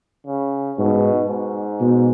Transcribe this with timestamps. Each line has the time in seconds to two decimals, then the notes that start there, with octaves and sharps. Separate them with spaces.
0.27 C#3
0.78 G#2 B2
1.29 G#2
1.80 B2